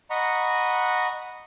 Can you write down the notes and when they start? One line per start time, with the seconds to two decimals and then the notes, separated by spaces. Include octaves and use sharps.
0.10 D#5 F#5 A#5 B5 C#6